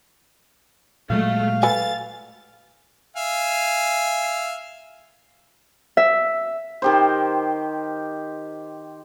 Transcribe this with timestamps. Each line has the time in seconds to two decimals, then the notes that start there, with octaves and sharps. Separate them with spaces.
1.10 A#2 F#3 G#3 A3 F5
1.63 A4 B4 G#5 A6
3.16 E5 F5 G#5
5.97 E5
6.82 D#3 G4 C5